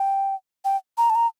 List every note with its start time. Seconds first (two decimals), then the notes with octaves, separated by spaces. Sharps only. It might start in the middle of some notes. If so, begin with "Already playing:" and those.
Already playing: G5
0.65 G5
0.98 A#5
1.10 A5
1.15 A#5